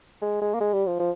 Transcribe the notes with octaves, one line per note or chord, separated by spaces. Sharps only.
G#3
G#3
A#3
G#3
G3
F3
F3